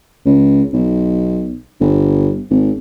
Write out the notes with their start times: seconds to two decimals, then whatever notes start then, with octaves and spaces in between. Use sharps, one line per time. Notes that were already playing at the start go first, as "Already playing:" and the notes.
0.26 C#2
0.73 B1
1.81 G1
2.50 G#1